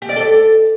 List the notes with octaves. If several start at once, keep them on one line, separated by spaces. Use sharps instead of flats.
G4
D5
A4